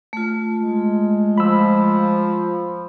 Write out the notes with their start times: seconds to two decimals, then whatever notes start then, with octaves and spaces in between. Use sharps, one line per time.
0.13 A3 F4
0.54 G#3
1.38 F3 B5 E6